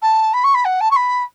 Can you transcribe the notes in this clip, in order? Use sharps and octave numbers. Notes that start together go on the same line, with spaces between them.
A5
B5
C#6
B5
F#5
A5
C#6
B5